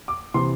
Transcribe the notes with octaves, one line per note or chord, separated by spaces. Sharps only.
D6
C3 E3 C6